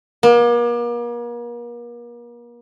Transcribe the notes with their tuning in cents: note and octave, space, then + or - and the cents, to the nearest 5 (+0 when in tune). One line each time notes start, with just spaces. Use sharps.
A#3 +40